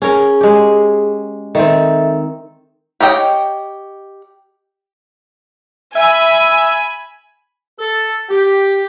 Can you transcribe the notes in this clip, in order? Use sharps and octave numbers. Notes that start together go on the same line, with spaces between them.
C#4 G#4 A#4
G#3 G4
D#3 C4 A4 E5
G4 C#5 D#5 G5
E5 G#5 B5
A4
G4